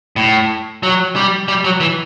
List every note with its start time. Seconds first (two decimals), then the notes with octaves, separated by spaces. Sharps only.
0.16 A2
0.83 F#3
1.16 G3
1.48 G3
1.64 F#3
1.80 E3